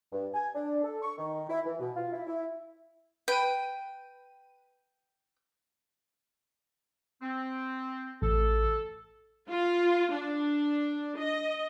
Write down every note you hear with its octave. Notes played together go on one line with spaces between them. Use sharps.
G2
G#5
D4
A4
C#6
D#3
E4
E3
B2
F4
E4
E4
B4 G5 D#7
C4
A1 A4
F4
D4
D#5